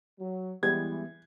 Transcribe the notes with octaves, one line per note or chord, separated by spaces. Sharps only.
F#3
E3 G3 G#3 B3 G#6